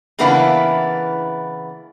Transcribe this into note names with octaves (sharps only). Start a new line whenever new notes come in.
C#3 E3 A#3 B3 D4 E4